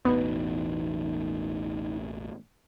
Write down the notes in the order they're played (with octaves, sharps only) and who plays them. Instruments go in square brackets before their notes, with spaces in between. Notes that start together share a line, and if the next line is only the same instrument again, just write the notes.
[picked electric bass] A1 E2 B2 [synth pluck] B3 [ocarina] D#4